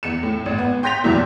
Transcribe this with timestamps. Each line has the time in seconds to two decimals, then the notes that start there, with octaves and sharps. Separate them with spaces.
0.03 E2 C#7 E7
0.23 A2
0.46 G#1
0.58 B3
0.83 G5 C6 G6 A#6 B6 F7
1.04 E2 G2 A#2 E3 F#3 E4